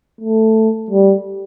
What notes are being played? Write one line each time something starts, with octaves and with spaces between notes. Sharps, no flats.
A3
G3